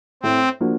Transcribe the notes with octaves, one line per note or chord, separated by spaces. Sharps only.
A2 C4
F3 A#3 D4 F#4